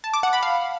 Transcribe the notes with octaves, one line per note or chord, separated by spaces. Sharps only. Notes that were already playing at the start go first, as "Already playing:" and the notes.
A5
D6
F#5
B5
F5